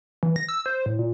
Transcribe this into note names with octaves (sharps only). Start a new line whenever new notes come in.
E3
A#6
E6
C5
A2
A#2